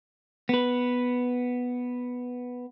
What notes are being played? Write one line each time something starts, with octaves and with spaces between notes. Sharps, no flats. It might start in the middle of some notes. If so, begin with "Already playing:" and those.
B3 B4